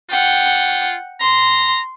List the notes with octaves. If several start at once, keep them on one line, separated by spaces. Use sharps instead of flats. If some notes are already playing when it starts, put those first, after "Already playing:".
F4 F#5 G5
A#5 C6